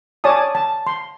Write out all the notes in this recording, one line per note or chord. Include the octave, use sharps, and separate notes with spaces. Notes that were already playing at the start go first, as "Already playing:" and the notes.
C#5 D5 G#5 A5 D#6
A5
C6